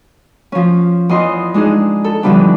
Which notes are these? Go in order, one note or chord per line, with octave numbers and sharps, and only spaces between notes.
F3 C#4
E2 D#5 C6
G#3 D4 D#4 G#4
A4
D3 E3 F3 G3 B3 D4